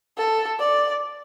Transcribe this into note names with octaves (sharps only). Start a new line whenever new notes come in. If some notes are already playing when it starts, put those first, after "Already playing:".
A4
D5